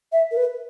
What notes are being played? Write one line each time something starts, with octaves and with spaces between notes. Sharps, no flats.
E5
A#4
B4